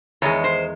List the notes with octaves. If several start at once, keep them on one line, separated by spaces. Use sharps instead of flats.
E2 D#3 G#3 C#5
C5